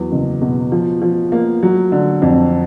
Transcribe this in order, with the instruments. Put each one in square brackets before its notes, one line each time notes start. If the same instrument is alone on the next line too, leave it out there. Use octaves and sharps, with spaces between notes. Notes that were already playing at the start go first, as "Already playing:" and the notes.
Already playing: [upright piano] E2 F#3
F#1
B2
F3
F3
A#3
F#3
D3
F2